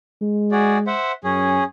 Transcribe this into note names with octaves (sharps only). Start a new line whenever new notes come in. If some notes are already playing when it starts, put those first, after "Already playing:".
G#3
F#4 G#4 D5
C5 E5 F#5
F#2 C#4 G#4